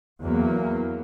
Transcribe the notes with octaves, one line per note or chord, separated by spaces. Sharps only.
E2 F#3 A#3